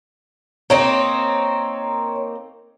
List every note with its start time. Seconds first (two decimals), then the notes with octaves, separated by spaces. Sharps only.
0.70 A#3 C4 D#4 C#5